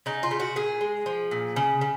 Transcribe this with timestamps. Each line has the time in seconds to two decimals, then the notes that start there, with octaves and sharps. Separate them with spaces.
0.06 C#3 D#4
0.23 F4
0.31 C#3
0.40 F#4
0.56 A#2 G#4
0.81 G#3
1.06 F3
1.31 A#2
1.56 C#3
1.81 C#3